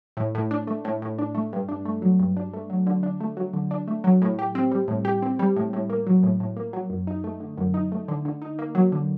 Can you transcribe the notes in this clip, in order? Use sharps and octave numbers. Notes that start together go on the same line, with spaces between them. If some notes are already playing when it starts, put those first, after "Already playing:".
A2
A2
D4
A3
A2
A2
D4
A3
G2
D4
A3
F#3
G2
D4
A3
F#3
D3
D4
A3
F#3
D3
D4
A3
F#3
A2
G4
C4
G3
A2
G4
C4
G3
A2
A2
A#3
F#3
A2
A2
A#3
F#3
F#2
D#4
A3
D3
F#2
D#4
A3
D3
D3
D#4
A#3
F#3
D3